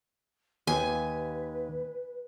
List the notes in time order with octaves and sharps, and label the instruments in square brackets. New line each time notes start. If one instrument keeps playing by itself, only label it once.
[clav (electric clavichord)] D#2 [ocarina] B4 [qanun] G#5